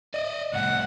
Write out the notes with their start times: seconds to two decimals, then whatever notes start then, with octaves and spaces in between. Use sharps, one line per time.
0.14 D5 D#5
0.53 C2 A2 F#5